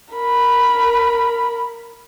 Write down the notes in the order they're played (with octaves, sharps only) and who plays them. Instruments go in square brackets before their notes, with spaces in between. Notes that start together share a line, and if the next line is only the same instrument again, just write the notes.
[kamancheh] A#4 B5